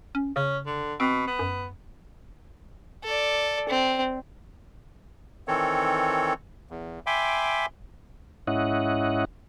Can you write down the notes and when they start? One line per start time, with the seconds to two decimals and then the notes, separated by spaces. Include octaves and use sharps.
0.15 C#4
0.36 C#3 C#4
0.66 D3
1.00 B2 C4
1.27 B3
1.39 F#2
3.04 A4 D5
3.69 C4
5.48 D#3 E3 C4 A4 C#5
6.71 E2
7.07 E5 G5 G#5 B5 C6 D6
8.47 G#2 C#4 E4 D#5 F#5